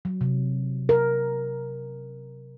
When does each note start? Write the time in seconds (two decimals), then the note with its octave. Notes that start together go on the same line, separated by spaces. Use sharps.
0.05 F#3
0.21 C3
0.89 A#4